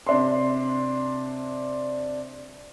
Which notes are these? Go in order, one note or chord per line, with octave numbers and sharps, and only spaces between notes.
C3 D4 C6